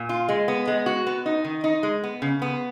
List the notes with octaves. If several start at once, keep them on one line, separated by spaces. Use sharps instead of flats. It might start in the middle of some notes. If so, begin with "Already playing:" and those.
Already playing: A#2
F4
G#3
B3
G#3
F#4
B3
D#4
D#3
D#4
G#3
B3
C#3
B3